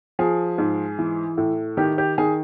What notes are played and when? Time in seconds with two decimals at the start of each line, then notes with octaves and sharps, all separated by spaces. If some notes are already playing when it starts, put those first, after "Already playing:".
0.19 F3 G#4
0.58 G#2
0.99 E3
1.38 A2
1.77 D#3 G4
1.98 G4
2.18 D#3 G#4